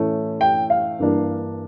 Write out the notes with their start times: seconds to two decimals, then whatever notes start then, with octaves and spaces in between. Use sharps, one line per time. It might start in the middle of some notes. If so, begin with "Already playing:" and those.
Already playing: A2 E3 A3 C#4
0.41 G5
0.70 F5
0.99 G2 E3 A#3 D4